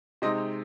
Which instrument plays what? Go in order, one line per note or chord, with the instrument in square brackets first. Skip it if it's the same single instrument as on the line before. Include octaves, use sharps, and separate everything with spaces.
[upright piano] C3 G#3 C4 D#4 D#5